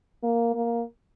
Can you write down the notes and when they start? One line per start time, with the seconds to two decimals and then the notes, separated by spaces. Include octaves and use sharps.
0.23 A#3
0.55 A#3